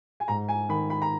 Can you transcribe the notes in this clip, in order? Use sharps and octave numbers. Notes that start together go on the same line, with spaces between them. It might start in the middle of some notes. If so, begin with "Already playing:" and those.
G#5
G#2 A#5
G#5
D#3 B5
B5
A#5